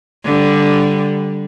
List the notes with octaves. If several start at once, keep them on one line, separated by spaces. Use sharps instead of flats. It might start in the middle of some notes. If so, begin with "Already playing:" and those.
D3 G3